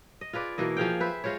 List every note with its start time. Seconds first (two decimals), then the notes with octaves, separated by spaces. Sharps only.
0.21 D#5
0.33 F4 G#4 B4 D5
0.58 B2 E3 A#3 D#5
0.77 F3 G#4 F5 G5
1.00 B4 C5 E5
1.24 G#3 F4 C5 C#5